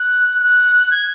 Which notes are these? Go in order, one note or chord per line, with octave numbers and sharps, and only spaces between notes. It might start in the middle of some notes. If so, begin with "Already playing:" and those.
Already playing: F#6
F#6
G#6